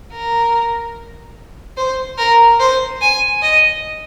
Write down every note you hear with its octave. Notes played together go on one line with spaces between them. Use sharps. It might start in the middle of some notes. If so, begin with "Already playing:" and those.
A#4
C5
A#4
C5
G#5
D#5